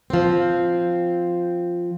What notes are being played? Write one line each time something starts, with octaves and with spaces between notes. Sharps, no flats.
F3 C4